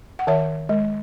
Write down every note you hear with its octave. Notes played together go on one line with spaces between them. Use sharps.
F#5
D#3 C#5 E5
G#3